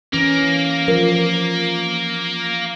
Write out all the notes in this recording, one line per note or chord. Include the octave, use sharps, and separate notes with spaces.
E3 A#3 C#4
F3 A#4